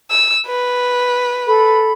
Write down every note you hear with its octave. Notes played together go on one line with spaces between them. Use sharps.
E6
B4
A4 B5